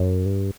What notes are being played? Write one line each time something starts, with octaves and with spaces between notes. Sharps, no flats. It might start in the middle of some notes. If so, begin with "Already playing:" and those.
Already playing: F#2
G2